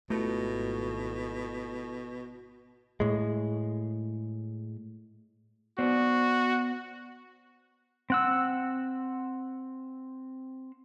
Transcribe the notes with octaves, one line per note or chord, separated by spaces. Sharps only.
G#1 B2 A3 E4 F4 A4
A2 G#3
B3 F#4 C5 D5
C4 F#5 E6